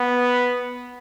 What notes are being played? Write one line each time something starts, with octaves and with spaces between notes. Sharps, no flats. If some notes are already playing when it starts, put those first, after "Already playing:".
Already playing: B3